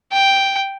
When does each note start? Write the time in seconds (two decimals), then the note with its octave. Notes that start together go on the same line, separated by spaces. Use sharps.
0.12 G5